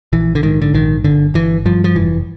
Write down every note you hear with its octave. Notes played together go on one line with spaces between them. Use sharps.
A#1 E3
D3
G#2 D#3
D3
A#1 D#3
G1 D3
G1 E3
G2 F3
F3
F1 E3